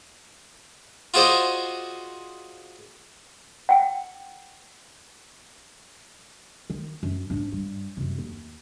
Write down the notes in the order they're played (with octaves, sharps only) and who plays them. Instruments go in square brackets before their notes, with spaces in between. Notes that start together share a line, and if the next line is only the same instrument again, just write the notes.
[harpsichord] F4 F#4 G#4 C5 D5 D#5
[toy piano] F#5 G5
[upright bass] D#3
F#2
G#2 D4
G2
F#2 C3
D#2